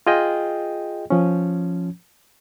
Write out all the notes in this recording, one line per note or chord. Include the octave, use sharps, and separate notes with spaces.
F4 G#4 D#5 G5
F3 C#4